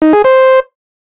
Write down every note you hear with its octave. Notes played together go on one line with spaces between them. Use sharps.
D#4
G#4
C5